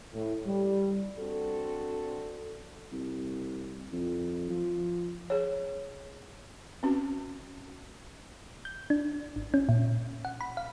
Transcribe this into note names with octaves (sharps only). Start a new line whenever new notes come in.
A2
G3
C4 D4 F#4 A4
C2
F2
F3
G#4 C#5
C4 C#4 F#4
G6
D4
G#1
C#4
A#2
F#5
B5
F5